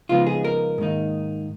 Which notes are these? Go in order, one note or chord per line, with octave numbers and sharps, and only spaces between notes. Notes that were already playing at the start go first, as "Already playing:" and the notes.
C#3 F3 G#3 B3 D#4 F4
G#4
A#4
G#2 D#3 A#3 D#4